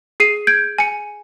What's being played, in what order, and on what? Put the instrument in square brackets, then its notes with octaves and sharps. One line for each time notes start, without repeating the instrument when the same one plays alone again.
[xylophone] G#4 C7 D#7
G6 G#6 D7
G#5 C#7